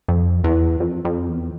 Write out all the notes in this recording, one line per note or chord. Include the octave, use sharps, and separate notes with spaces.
F2
E2
F2
F2
E2